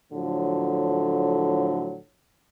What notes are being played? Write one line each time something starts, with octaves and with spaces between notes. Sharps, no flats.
A2 D3 F3 F#3